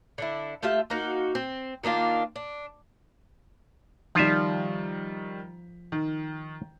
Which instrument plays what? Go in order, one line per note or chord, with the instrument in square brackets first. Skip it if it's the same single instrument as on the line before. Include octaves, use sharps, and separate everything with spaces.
[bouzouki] D3 D4 E4
A3 F4 G4 E5
A#3 D#4 F#4
C4
D#3 A#3 D4 F4
D4
[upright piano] D#3 G3 [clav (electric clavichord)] F3 F4 E5
[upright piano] D#3